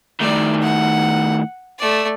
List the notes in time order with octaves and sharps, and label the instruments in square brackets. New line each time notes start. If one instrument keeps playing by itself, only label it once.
[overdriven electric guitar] A2 D#3 [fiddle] D5
[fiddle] F#5
A3 D5